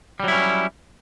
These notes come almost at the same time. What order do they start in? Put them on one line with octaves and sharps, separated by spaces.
G3 F#3 E4 C#4